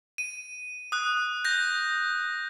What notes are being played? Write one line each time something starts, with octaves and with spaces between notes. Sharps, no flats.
D#7
D#6 F#6
G6 A#6